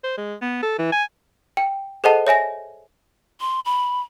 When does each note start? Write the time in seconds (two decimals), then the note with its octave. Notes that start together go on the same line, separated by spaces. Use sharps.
0.04 C5
0.17 G#3
0.42 B3
0.63 A4
0.79 E3
0.92 G#5
1.57 G5
2.04 G#4 A4 C5 D#5 F#5 A5
2.27 C#5 E5 G#5 A#6
3.40 C6
3.65 B5